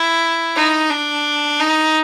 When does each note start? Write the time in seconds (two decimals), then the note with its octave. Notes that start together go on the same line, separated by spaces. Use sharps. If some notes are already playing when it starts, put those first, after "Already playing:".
Already playing: E4
0.55 D#4
0.90 D4
1.60 D#4